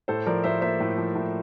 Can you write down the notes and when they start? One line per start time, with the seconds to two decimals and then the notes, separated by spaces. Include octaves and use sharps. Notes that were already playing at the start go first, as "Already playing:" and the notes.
0.08 A2 A4 C5
0.26 F3 A#4 D5
0.44 A2 C5 E5
0.61 A#3 C5 E5
0.80 A2
0.98 F3
1.15 A2